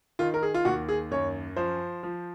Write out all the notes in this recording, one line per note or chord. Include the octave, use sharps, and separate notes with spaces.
D#3 F4
A#4
G#4
F4
D#2 F#4
G#4
F#2 C#5
F3 C5
F3